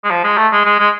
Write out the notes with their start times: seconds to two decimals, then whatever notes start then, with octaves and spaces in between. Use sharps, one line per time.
0.04 G#3
0.10 F3
0.24 G#3
0.37 A3
0.52 G#3
0.66 G#3
0.80 G#3